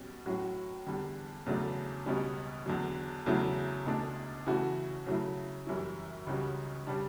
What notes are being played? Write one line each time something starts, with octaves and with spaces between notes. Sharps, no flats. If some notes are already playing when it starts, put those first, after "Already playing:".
Already playing: B2 G3 C#4 F#4
A2 F#3 C#4 F#4
E2 D3 G3
E2 C#3 F#3 A3 D4
C#2 B2 G3 C#4
E2 D3 F#3
E2 C#3 F#3 A3 E4
C#2 B2 A3 D4
C#3 E3 A3 C#4 F#4
C#3 F#3 A3 E4
F#2 E3 G3 C#4 E4
C#2 C#3 G3 C#4 F#4
C#3 G3 D4